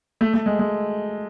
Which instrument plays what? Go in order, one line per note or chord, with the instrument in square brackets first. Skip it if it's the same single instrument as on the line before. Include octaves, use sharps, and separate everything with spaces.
[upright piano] A3
A3
G#3
G#3